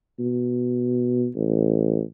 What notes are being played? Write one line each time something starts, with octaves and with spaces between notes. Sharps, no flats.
B2
A1